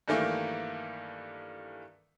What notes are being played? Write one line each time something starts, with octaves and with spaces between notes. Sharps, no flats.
G2 D#3 E3 A3 A#3